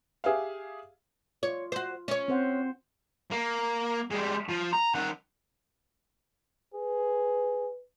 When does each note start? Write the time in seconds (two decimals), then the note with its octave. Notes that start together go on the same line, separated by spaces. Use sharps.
0.24 G4 G#4 E5 F5
1.43 F4 C#5
1.72 F#4 C5
2.08 C#4 C#5
2.28 C4 C5 F#5
3.31 A#3
4.11 G3 G#3
4.49 F3
4.73 A#5
4.95 D#3 F#5
6.74 G#4 B4